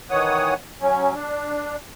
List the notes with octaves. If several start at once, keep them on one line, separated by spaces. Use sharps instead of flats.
D#3 E3 C#5 F#5 D#6
F#3 C#4
D4